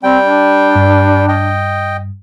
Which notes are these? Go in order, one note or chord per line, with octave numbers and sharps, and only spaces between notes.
G3 C4 G5
D4
G2
D#5 G5